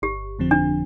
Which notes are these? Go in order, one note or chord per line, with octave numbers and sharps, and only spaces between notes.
G1 G4
F2 D3 F3 C4
D4